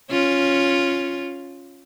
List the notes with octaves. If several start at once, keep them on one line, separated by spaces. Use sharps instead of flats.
C#4 F4